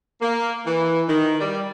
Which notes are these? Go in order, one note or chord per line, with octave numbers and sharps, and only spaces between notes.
A#3
E3
D#3
G3